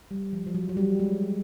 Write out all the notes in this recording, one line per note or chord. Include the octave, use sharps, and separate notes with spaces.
G3
F3
F3
F#3
F#3
G3
G#3